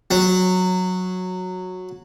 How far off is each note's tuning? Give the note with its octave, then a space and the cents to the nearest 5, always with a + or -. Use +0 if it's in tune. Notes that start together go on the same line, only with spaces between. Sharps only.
F#3 -10